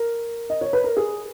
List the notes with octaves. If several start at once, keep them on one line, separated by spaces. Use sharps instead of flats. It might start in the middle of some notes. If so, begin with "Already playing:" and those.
Already playing: A#4
D#5
C#5
B4
A#4
G#4